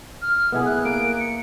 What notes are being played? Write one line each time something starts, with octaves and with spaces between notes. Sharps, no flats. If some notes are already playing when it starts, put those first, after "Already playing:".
F6
B3 E4 G#4
F#6
A#3 D7
C#7